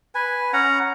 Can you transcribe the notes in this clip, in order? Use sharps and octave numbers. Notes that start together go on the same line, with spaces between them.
B4 G#5
C#4 F#5 A#5